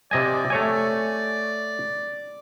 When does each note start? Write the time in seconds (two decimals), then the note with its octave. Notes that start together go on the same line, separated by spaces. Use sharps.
0.11 C3 D5 D#5 G#5
0.50 A3 C#5 G#5